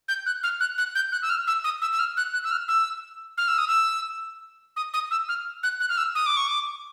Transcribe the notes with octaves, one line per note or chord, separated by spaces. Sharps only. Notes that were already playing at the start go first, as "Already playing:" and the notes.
G6
F#6
F6
F#6
F#6
G6
F#6
E6
F6
E6
D#6
E6
E6
F6
F#6
F#6
E6
F6
E6
F6
E6
D#6
E6
D#6
D#6
E6
F6
F#6
F#6
F6
E6
D#6
D6
C#6
D6